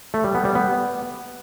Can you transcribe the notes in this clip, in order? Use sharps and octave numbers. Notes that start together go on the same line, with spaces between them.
A3
G3
B3
G3
B3